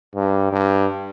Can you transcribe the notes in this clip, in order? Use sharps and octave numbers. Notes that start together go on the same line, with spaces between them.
G2
G2